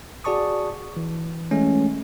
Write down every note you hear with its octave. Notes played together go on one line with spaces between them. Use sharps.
F#4 G#4 D5 A5 C#6 D#6
E3
E3 G#3 A3 C#4